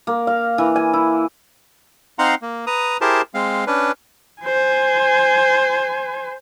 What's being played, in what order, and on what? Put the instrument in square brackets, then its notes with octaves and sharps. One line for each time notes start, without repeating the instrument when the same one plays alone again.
[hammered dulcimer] A#3
F5
E3
G#5
E4
[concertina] C4 D#4 F5 F#5 A#5 C6
A#3
B4 A#5 D#6
E4 G4 G#4 A#4 C5 A5
G#3 C4 F5
C#4 D4 B4
[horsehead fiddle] C5 G#5